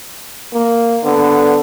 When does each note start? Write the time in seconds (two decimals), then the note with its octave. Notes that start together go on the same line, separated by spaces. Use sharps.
0.53 A#3
1.05 D3 B3